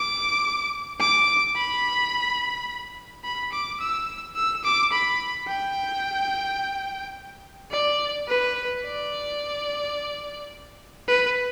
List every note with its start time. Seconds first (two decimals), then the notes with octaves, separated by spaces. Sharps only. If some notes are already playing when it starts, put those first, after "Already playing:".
Already playing: D6
1.00 D6
1.56 B5
3.24 B5
3.52 D6
3.80 E6
4.36 E6
4.64 D6
4.92 B5
5.48 G5
7.72 D5
8.28 B4
8.84 D5
11.08 B4